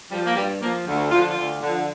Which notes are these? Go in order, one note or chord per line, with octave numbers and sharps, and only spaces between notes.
F3 G3
A#3
G2 G3
F3 A#3
D2
D3 F3 F4
D4
F4
D2
D3 F3